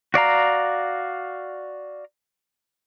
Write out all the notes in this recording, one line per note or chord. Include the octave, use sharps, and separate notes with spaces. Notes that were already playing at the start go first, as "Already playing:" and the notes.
F#4 D5 F5 A#5